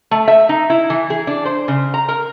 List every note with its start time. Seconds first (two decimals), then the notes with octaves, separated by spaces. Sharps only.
0.11 A3
0.28 E5
0.49 D#4
0.70 E4
0.90 E3
1.10 G#4
1.27 D4
1.45 C5
1.68 C#3
1.94 A#5
2.09 A#4